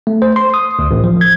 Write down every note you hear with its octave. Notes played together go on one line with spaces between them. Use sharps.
A3
C5
C6
D#6
D2
A1
F3
G#6